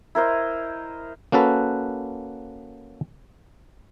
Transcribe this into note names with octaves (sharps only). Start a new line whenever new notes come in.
E4 A#4 C5 D#5
A#3 C#4 F#4 A4 B4